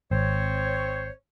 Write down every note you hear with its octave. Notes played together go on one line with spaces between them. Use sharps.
G#1 C4 C5 C#5